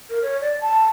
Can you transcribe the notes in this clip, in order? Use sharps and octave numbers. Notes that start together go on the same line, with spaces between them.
A#4
C#5
D5
A5